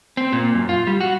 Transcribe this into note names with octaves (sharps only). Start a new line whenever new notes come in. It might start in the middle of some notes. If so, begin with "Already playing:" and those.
C4
A#2
F#2
F4
G3
F#4